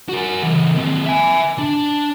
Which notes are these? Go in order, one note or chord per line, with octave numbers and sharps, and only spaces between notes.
F#4 A#4
C#3 E3
D#2 C4
E5 G#5
D4